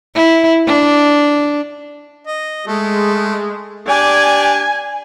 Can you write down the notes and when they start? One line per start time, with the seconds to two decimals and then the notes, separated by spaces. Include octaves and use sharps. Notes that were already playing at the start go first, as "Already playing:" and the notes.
0.15 E4
0.67 D4
2.27 D#5
2.67 G#3 A3
3.89 D4 G4 D5 G#5